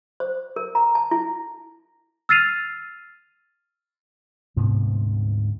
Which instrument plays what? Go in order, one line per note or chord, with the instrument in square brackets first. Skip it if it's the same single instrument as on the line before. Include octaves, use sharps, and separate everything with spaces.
[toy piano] C5
A#4
A#5
A5
E4
[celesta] E6 F6 A6 C7 D#7 F7
[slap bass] D2 G#2 C3 B3